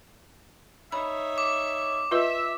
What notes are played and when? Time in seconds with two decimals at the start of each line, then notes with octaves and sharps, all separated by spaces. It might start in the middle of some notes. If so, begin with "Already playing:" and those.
0.92 D#4 C#5 E5 B5
1.38 D6
2.11 F4 B4 D#5 E5